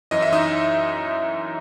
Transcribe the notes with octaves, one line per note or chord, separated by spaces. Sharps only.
F#2 E3 D#5
E5
D#4 D#5